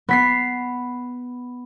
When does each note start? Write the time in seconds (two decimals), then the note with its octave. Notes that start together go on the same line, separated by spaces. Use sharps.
0.09 B3 B6 C7